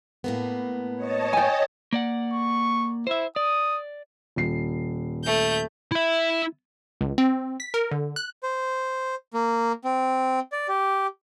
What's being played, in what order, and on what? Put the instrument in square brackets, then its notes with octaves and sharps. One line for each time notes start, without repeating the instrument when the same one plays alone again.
[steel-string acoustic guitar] A2 A#3 B3
[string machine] C#5 D#5 A5
[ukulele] G5 G#5
[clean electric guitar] A#3 D5 F#5
[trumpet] C#6
[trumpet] E4 [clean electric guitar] C5 E5
[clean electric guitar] D5 [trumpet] D#6
[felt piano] D#1 C7
[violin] A3 G6
[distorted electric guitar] E4 E5
[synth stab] C#2
C4
B6
A#4
D3
F#6
[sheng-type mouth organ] C5
A#3
C4
D5
G4